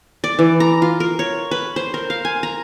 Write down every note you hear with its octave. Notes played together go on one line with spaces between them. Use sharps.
D5
E3
A#5
F4
A#4
C#5
B4
C5
A#4
F5
G#5
A#5